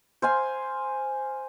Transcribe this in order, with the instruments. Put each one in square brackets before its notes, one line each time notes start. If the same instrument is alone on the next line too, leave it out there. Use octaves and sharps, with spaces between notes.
[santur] C5 F5 G#5